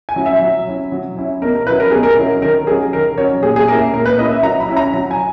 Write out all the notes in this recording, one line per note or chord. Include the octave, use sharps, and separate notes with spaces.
G#5
F#3 C#4 E4
E5
F#3
C#4 E4
F#3
C#4 E4
B2 A#4
A#4
F#3 C#4 E4 B4
A#4
B2 G#4
A#4
F#3 C#4 E4
D#3 A#4
F#3 C#4 G#4
D#3 A#4
F#3 C#4 C#5
A#2 G#4
G#4
A#3 C#4 E4 A#4
A#2 A#4
B4
A#3 C#4 E4 D#5
E5
F#3 A#5
B5
C#4 E4
A#5
F#3 A#5
G#5